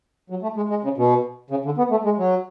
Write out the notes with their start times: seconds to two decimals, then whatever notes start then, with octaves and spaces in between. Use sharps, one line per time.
0.30 F#3
0.43 A3
0.56 G#3
0.70 G#3
0.84 C#3
0.98 B2
1.50 C#3
1.65 D3
1.78 B3
1.91 A3
2.05 G#3
2.18 F#3